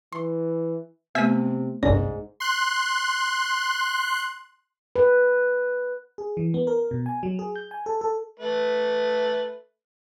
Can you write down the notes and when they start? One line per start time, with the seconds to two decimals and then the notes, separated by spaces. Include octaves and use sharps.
0.12 E3 C6
1.15 C3 A3 B3 E5 G#6 A6 B6 D#7
1.83 G1 C2 G#2 C#4 D5
2.40 C6 F#6
4.96 B4
6.18 G#4
6.37 E3
6.54 B3
6.67 A#4
6.91 B2
7.06 G#5
7.23 F#3
7.39 G#4
7.56 G6
7.71 G#5
7.86 A4
8.01 A4
8.40 A3 B4